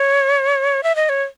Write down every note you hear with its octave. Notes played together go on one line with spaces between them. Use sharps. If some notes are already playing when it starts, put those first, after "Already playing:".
Already playing: C#5
E5
D#5
C#5